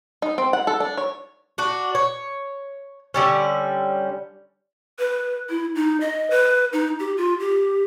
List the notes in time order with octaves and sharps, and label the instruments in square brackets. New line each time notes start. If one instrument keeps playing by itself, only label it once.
[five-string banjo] D#4
C4
F#5
A4
D4
C#5
[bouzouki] D4 F#4
C#5
D3 G3 C#4
[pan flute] B4
E4
D#4
D#5
B4
D#4
G4
F4
G4